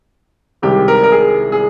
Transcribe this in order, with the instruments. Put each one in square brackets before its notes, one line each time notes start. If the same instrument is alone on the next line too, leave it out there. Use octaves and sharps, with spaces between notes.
[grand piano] C2 C3 D#3 G#3 G4
A#4
A#4
G#4
G#4